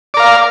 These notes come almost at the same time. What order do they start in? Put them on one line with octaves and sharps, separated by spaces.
D5 A#4 F5